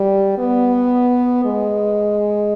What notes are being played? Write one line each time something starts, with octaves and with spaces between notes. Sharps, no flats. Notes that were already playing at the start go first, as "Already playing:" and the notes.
Already playing: G3
B3
G#3